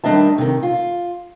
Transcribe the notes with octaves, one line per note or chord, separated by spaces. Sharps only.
D#3 G3 D4 D#5 E5 A5
C3 D#3
F4